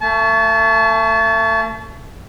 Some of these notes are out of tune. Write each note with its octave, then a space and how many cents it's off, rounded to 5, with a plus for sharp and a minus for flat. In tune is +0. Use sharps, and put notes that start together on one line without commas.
A3 +35 A5 -30